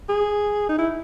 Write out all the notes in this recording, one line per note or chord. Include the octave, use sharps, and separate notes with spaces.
G#4
D#4
E4